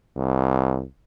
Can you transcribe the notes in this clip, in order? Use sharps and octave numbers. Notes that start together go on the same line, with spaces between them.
C2